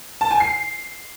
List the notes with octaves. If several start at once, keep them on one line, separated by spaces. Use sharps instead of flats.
A5
G#5
C7